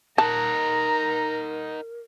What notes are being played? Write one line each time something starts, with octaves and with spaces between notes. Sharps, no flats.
D#4 A#4 F#5 A5 A#5